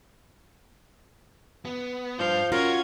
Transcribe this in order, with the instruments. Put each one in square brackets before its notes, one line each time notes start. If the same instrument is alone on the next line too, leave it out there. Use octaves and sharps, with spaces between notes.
[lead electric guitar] B3
[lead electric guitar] G2 D4 [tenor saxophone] F3 [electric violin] F5 G6
[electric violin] C#4 G#6 [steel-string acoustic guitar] F4 [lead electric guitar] F#4 [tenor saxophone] A#4